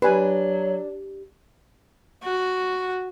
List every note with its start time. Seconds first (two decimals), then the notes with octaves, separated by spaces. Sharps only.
0.02 F#3 D4 G4 B4 G#5
2.23 F#4